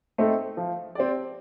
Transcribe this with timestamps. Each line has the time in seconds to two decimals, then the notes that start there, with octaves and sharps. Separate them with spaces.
0.18 A3 C4 D#4 A4
0.57 F3
0.95 C4 G4 D5